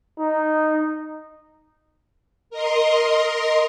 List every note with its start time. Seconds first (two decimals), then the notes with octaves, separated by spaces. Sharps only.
0.19 D#4
2.50 A#4 D#5 C6